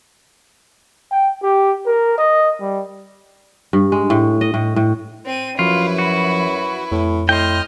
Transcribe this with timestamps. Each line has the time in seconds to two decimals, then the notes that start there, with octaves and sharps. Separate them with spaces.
1.11 G5
1.43 G4
1.86 A#4
2.18 D#5
2.60 G3
3.73 G2
3.92 G#3
4.10 A2
4.41 D#5
4.54 A2
4.76 A2
5.25 C4 D#7
5.59 F#2 F3 E4 F4 B4
5.98 F#4
6.91 F2 A2
7.29 A2 D#5 G5 C6 F6